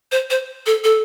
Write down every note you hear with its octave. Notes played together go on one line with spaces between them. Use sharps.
C5
C5
A4
A4